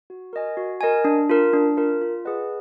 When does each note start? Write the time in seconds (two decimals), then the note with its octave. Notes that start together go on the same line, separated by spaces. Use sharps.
0.10 F#4
0.33 A#4 D#5 G#5
0.57 F#4
0.81 A#4 D#5 G#5
1.05 D4
1.29 F4 A#4
1.53 D4
1.77 F4 A#4
2.02 F4
2.25 G#4 B4 D#5 F#5